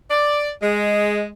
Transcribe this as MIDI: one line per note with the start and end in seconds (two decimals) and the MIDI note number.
0.11 0.50 74
0.63 1.28 56